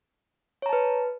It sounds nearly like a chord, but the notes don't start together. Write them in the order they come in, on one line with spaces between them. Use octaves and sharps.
C#5 A#5 A5 B4